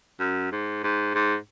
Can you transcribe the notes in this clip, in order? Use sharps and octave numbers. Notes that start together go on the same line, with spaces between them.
F#2
G#2
G#2
G#2